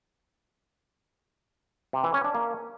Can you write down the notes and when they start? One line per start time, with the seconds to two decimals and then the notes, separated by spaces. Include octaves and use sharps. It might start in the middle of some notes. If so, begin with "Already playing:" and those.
1.93 C3
2.04 E3
2.14 C#4
2.24 D4
2.35 A#3